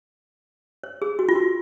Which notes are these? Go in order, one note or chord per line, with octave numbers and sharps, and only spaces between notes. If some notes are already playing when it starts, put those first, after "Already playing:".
C#5
G#4
F#4
F4
F#4